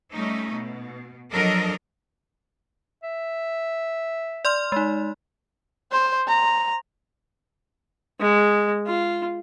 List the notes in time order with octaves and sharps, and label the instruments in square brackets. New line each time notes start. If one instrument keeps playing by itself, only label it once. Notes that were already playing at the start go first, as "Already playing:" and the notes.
[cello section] G3 A3 C#4 D#4
B2
F3 F#3 D4 A4 A#4 D#5
[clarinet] E5
[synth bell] D5 C6 F6
G#3 D#4
[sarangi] C5
A#5
[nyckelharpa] G#3
F4